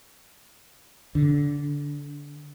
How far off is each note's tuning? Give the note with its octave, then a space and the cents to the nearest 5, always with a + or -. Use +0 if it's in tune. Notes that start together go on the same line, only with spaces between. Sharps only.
D3 -20